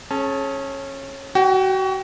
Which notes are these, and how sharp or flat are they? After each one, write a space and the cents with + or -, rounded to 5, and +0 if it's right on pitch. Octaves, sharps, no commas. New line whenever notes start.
C#4 -20 G#4 +35 A5 +0
F#4 +30 G5 +0